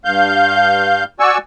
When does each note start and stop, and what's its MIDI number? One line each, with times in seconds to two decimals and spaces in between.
0.05 1.04 43
0.05 1.04 77
0.05 1.04 91
1.20 1.38 66
1.20 1.38 74
1.20 1.38 80
1.20 1.38 85
1.20 1.38 88